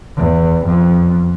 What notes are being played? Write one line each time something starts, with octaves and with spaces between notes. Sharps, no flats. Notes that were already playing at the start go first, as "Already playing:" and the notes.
E2
F2